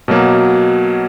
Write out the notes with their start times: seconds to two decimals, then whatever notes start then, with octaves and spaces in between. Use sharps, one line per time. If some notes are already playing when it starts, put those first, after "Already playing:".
0.08 B2 F#3 A#3